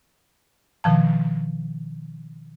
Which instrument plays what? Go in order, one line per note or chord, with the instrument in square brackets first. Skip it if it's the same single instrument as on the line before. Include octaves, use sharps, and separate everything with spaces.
[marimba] B2 D#3 F3 A5